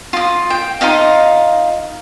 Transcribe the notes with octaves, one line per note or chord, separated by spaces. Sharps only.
F4 D#6
G5
D#4 F4 D#5 F5